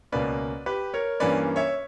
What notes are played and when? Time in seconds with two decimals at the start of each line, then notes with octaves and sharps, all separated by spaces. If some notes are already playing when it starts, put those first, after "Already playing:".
0.12 C#2 B2 A#3 C#4 B4 D5
0.66 G4 B4
0.93 A#4 C#5
1.20 G2 E3 A#3 C#4 B4 D5
1.56 C#5 E5